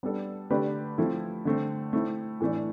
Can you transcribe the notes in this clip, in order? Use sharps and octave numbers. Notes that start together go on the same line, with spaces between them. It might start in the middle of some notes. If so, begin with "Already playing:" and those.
G3 B3 D4 A4
D3 A3 D4 G4 B4
F3 A3 C4 E4 A4
D3 A3 C4
A3 C4 E4
A2 E3 A3 D4